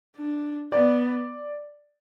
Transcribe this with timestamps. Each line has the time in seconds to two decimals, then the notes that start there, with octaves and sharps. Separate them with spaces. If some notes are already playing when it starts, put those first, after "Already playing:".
0.16 D4
0.72 B3 D5